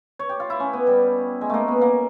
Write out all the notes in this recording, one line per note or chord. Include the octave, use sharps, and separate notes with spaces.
C#5
G4
F4
E4
C#4
B3
G3
G#3
A3 A#3
B3
A#3